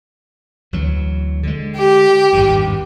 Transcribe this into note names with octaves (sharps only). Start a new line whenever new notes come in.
D2 E3 F#3
D3 G#3
G4
G#1 E2 G2